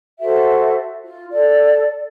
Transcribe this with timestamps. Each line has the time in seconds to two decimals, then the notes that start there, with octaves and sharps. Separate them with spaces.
0.19 F#4 A4 C5 E5
1.04 F4
1.32 A4 D5